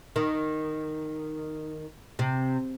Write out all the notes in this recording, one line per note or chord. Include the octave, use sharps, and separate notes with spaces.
D#3
C3